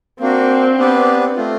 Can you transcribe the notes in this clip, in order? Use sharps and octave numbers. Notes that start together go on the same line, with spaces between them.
A#3 C4 D4 F#4
B3 D4 G4 B4 D5
A3 C4 F4